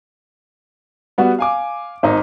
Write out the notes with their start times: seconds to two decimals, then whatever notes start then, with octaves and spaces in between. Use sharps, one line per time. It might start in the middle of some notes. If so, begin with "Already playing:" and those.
1.18 G3 B3 F#4
1.39 F5 G#5 D6
2.03 G#1 D#4